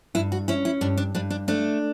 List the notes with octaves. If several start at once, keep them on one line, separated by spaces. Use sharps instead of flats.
G2 E4
F#4
C#4 E4
E4
G2 D4
D4
G2 D4
D4
A3 D4